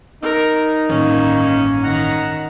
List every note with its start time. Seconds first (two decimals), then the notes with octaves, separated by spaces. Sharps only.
0.22 D#4 A#4
0.89 A1 G2 D#3 A#3 C#4
1.83 D#3 F#5 A#5